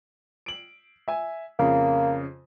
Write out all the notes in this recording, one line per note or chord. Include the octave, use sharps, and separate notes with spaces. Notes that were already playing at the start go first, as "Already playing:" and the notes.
D7 F#7
E5 G#5
F2 C#3 A#3